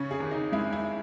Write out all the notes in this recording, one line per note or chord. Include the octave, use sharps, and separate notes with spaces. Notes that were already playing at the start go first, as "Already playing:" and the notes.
Already playing: C#3 C#4
G#4
D#2
D#4
G#3 E4
E4